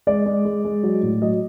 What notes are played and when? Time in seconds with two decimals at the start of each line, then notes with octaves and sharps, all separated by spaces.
0.07 G#3 D5
0.26 G#3
0.45 G#3
0.64 G#3
0.83 F#3
1.03 A2
1.22 F#3 D#5